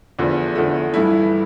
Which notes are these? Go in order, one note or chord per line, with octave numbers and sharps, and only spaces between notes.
E2 D3 F3 A3
E2 D3 F3 A3
G2 E3 A3 E4